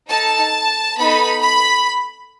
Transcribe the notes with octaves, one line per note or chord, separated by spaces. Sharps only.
D#4 A4 A5
B3 D#4 A4 B5
B5